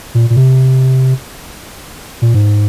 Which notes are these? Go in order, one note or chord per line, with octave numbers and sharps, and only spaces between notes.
A#2
A#2
C3
A#2
G#2